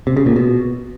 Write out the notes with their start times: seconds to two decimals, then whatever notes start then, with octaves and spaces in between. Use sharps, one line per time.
0.07 C3
0.17 C#3
0.26 A#2
0.36 B2